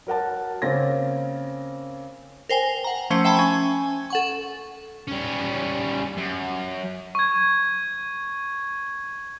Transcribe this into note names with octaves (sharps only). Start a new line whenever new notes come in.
F#3 A#4 F#5 A5
C#3 A#3 C4 C#4 A6 A#6
A#4 C5 G5 G#5
F#5 A#5
F3 A3 C#4 C5 E6 C#7
E5 G5 A5 B5
C#4 G#5
A4 F#5 C#6
G3 C#4
F#2
C#6 G#6